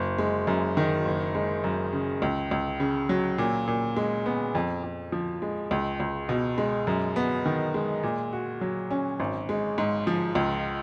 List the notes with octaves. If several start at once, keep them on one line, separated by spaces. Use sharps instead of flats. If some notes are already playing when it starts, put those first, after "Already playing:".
Already playing: F#1
G#3
F#2
D#3
F#1
G#3
F#2
C#3
C#2
C#2
C#3
F#3
A#2
A#2
G#3
B3
F2
F2
F3
G#3
C#2
C#2
B2
G#3
F#2
B3
D#3
G#3
A#2
F#4
F#3
C#4
G#1
G#3
G#2
F3
C#2